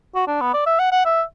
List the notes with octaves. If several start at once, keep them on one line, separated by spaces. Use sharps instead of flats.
F#4
D4
B3
D5
E5
F#5
F#5
E5